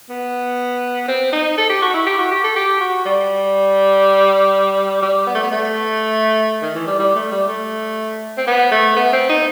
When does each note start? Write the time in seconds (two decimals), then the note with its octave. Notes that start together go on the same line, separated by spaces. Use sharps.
0.10 B3
1.08 C4
1.32 D#4
1.58 A4
1.70 G4
1.82 F#4
1.94 E4
2.06 G4
2.18 F#4
2.31 G4
2.43 A4
2.56 G4
2.81 F#4
3.05 G3
5.02 G3
5.27 B3
5.35 A3
5.43 B3
5.51 A3
6.62 D#3
6.75 E3
6.87 G3
6.99 G3
7.15 A3
7.32 G3
7.48 A3
8.38 C4
8.47 B3
8.71 A3
8.96 B3
9.13 C4
9.29 D#4